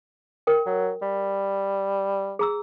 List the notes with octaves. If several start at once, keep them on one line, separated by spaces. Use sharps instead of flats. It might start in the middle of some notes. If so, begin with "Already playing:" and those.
A#4 G5
F#3
G3
G#4 A#5 E6